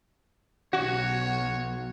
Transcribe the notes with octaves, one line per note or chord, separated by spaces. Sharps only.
B1 F#4 C#5